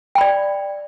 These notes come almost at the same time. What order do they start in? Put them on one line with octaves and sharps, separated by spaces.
G5 B5 D5